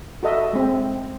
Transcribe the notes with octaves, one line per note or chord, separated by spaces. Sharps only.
F#4 A4 D#5 E5
G#3 C4